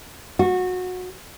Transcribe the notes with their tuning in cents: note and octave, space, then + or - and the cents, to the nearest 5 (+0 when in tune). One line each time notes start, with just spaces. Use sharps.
F#4 -20